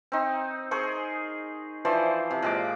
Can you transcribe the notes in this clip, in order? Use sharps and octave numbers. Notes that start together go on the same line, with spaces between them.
C4 D#4
G#4 A#4 C5 C#6
E3 F3 C5 D5
C3
A#2 G#3 D6